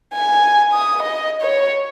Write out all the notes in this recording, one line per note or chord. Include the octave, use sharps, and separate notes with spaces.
G#5
D#6
D#5
C#5